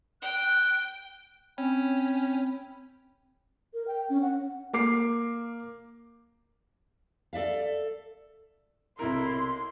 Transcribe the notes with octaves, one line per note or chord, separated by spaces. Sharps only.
G5 F#6
C4 C#4 G5 B5
A#4
G5
C#4
F#5
A#3 D6 C7
A4 D5 E5 F5
B1 C3 E4 A#4 C6